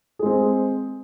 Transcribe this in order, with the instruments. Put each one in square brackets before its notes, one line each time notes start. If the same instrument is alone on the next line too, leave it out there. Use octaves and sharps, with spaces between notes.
[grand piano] G#4
G#3
C4